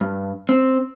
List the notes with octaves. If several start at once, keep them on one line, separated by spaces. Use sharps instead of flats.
G2
C4